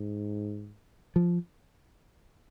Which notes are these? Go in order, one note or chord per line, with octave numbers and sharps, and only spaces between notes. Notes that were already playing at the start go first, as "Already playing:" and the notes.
Already playing: G#2
F3